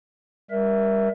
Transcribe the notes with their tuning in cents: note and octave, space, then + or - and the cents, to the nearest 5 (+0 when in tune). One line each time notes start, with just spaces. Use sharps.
G3 +35 A#4 +25 E5 +0